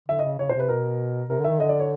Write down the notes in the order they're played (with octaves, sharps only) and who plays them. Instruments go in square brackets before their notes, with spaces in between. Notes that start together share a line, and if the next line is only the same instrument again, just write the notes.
[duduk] D3 [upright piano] E5
[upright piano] D#5
[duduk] C#3
[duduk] C#3 [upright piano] C#5
[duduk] B2 [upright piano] C5
[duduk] C3
[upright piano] B4
[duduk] B2 [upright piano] A#4
[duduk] C3 [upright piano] A#4
[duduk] D3
[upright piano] E5
[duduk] D#3
[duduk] D3 [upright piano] D#5
[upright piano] D5
C#5